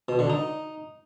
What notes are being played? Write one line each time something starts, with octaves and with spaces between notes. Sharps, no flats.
B2
D3
D#4